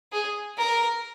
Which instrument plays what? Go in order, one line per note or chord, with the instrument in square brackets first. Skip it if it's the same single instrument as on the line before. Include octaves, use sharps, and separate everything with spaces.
[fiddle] G#4
A#4